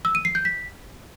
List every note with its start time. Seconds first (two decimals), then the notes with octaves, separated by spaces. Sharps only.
0.05 E6
0.15 D#7
0.25 C7
0.35 G6
0.45 B6